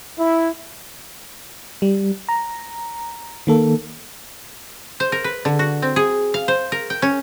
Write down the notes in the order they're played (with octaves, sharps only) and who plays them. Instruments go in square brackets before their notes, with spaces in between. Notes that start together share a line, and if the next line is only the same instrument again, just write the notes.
[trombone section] E4
[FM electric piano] G3
A#5
D#3 A#3 A4
[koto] C5
A#4
B4
D3
F#4
C4
G#4
F5
C5
A#4
G5
C#4